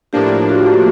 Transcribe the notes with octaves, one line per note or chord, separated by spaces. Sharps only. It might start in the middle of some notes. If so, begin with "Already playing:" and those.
A2 F3 A#3 D4 G4
F4
F#4
G4